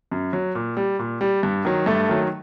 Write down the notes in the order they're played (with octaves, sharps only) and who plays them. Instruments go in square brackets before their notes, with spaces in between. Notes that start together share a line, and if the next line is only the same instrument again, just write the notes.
[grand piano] F#2
F#3
A#2
G3
A#2
G3
G2
D#3 F#3
G2 A3
D#3 F#3